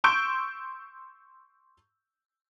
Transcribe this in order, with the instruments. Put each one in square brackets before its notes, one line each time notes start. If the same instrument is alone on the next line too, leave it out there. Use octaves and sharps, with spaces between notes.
[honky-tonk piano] C6 C#6 E6 G6 D7